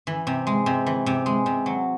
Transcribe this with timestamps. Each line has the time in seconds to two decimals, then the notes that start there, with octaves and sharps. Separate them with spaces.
0.07 E3
0.27 C3
0.47 G#3
0.66 C3
0.86 E3
1.06 C3
1.26 G#3
1.46 C3
1.66 F#3